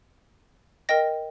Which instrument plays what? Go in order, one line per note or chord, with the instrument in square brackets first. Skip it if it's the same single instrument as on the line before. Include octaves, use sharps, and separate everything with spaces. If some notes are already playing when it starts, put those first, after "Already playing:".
[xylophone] A#4 D#5 G5 A#6